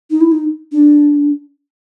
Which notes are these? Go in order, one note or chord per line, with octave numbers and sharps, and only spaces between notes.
D#4
E4
D#4
D4